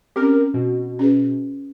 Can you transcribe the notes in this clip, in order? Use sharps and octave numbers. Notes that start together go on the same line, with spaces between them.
C4 C#4 G4 A#4
B2
C#4 G#4 B4